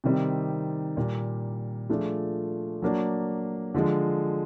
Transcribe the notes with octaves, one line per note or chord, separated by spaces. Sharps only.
C3 D#3 G3 C4
A#2 G3 A#3
F3 A3 D4 F4 G#4
F#3 A#3 D4
D3 F3 G#3